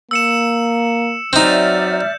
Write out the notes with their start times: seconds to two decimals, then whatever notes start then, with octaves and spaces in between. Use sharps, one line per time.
0.11 A#3 E6 C#7 E7
1.33 F#3 C4 D#4 D5 E5 F6 G6